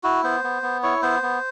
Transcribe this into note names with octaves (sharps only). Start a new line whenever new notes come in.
E4 F#4
B3 C5
B3
B3
E4 C#5
B3 C5
B3